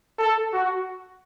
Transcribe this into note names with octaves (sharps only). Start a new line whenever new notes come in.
A4
F#4